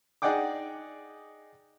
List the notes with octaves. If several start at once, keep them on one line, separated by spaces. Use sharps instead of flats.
D#4 G#4 D5 F#5 G5 D6